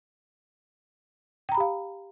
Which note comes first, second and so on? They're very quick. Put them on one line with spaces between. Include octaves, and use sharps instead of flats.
G5 A#5 B5 G4 F5